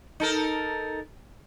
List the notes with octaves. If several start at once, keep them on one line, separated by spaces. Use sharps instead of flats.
D#4 A4 A#4